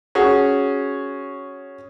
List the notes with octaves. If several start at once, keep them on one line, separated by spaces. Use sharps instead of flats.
C#4 F#4 G#4